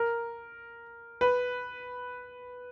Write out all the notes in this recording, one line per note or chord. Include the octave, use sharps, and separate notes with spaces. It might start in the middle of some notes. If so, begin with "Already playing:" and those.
Already playing: A#4
B4